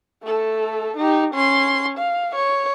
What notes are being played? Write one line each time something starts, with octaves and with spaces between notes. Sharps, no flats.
A3 A4
D#4 G4
C#4 C6
F5
C#5